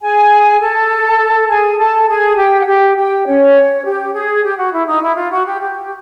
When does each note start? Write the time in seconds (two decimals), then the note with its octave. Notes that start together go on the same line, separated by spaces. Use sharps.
0.02 G#4 G#5
0.60 A4 A5
1.49 G#4 G#5
1.78 A4 A5
2.08 G#4 G#5
2.37 G4 G5
2.60 F#5
2.67 G4 G5
2.96 G4 G5
3.26 C#4 C#5
3.84 G4
4.14 G#4
4.42 G4
4.57 F#4
4.73 E4
4.87 D#4
5.02 E4
5.16 F4
5.31 F#4
5.46 G4
5.61 G4